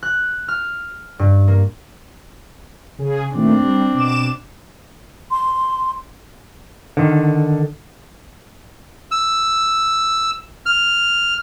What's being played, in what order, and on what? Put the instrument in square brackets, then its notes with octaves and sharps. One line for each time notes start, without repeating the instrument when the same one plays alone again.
[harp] F#6
F6
G2
A#3
[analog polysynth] C#3 G#4
[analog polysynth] A#2 D#3 A3 [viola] C4 D4
[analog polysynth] G3
B2 D6 E7
[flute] C6
[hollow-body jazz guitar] D3 D#3
[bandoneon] E6
F6